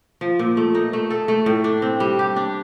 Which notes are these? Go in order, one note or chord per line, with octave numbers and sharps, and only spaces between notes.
F3
A#2
A3
D#4
A3
A4
A3
A2
D4
C4
G3
G4
D4